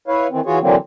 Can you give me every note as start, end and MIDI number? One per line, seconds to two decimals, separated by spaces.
0.08 0.27 64
0.08 0.27 71
0.08 0.27 73
0.08 0.27 77
0.31 0.40 51
0.31 0.40 52
0.31 0.40 60
0.46 0.59 52
0.46 0.59 65
0.46 0.59 66
0.46 0.59 68
0.46 0.59 73
0.61 0.76 50
0.61 0.76 52
0.61 0.76 54
0.61 0.76 58
0.61 0.76 60